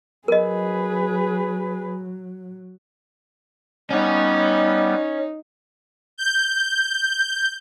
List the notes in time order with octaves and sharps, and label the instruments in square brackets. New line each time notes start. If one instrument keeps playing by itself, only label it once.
[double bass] F#3 [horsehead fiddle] G#4 B4 [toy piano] A#4 D#5
[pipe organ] G3 B3 [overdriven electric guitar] C#4 C#5 [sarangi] D#4
[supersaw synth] G6